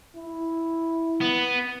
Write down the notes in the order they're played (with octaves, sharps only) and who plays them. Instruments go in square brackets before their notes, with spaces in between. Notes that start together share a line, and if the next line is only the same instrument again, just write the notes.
[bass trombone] E4
[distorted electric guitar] B3